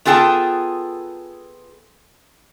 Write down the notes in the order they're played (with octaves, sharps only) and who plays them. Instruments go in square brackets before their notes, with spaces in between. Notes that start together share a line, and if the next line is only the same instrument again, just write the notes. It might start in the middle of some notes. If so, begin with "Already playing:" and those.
[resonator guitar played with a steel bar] B3 F4 G#4 A4 G5 A5